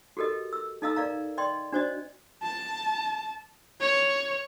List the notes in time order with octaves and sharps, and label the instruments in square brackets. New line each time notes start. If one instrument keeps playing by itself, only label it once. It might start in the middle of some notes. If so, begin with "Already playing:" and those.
[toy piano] F#4 G4 A4 A#4 D#5
E6
D#4 A4 D#5 F5 A#5 E6
A#4 D5 F5 A#5
D5 D#5 G5 C6
D4 F#4 C5 D5 D#5
[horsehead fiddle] A5
C#5